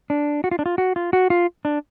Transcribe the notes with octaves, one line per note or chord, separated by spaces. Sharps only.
D4
F#4
F4
D4
F4
F#4
F4
F#4
F4
D4